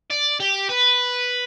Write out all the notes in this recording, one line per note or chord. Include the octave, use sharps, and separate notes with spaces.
D5
G4
B4